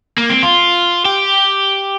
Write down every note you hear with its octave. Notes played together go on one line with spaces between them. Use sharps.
A#3
C4
F4
G4